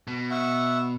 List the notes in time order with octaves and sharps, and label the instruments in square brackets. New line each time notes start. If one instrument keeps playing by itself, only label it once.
[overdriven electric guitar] B2
[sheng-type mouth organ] E5 F#5 C#6